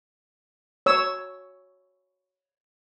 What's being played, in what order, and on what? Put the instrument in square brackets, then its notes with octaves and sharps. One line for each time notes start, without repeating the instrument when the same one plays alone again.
[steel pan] C#5 E6